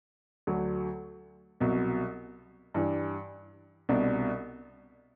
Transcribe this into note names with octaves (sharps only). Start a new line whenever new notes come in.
D2 D3 F#3
C2 B2 F#3
G2 E3 G3
C2 B2 G3 D4